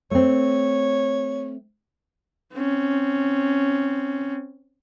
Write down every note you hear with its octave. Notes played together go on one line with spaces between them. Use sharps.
A3 C4 C#5
C4 C#4